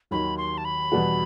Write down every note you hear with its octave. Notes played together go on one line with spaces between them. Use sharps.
D#2 D#3 F#3 B5
C6
A5
B5
E2 B2 G3 B3 F#4